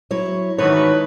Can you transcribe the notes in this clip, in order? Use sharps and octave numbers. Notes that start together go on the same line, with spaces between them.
F#3 E4 C#5
G#2 D#3 E3 A3 F#4 B4 C#5